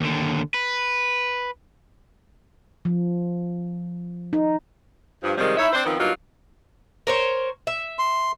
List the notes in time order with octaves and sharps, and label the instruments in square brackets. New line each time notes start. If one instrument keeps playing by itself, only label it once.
[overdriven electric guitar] D#2 D3
B4
[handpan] F3
D#4
[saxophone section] G2 F3
C3 D#3 F3 G3 G#3
D#4 E4 C#5 E5
C4 D4 C5
D#3 F3 B3 C4
G2 F#3 A#3 D#4 F4
[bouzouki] A#4 C5 C#5
E5
[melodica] C6